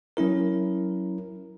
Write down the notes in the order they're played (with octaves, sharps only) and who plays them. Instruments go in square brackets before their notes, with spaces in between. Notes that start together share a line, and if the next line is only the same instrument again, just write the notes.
[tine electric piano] F#3 C#4 E4 A#4